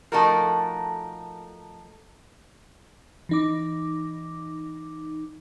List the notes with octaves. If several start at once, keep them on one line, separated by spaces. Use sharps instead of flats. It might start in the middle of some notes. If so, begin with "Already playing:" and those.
F3 A3 D#4 F#4 A4 A#4
E3 D#4 D6